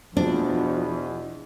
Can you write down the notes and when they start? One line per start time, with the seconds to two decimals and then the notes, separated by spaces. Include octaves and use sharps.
0.17 E2 B2 F3 D4